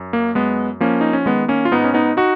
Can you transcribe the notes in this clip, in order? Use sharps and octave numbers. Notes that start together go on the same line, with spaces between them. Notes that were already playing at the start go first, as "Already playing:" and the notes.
Already playing: F#2
A#3
F#2 G#3 B3
F3 A#3 C#4
D#4
C#4
D#3 G#3 B3
A#3 C#4
F4
G#2 B3 D#4
C#4
B3 D#4
D#4 F#4